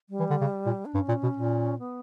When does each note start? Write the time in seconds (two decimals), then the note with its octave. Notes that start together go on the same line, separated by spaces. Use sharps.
0.10 G3
0.20 E3
0.30 D3
0.41 C#3
0.66 A#2
0.86 D4
0.95 G2 C#4
1.08 A#2
1.23 B2
1.37 A#2
1.79 B3